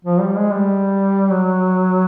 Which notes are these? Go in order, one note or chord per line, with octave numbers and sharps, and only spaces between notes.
F3
G3
G#3
G3
F#3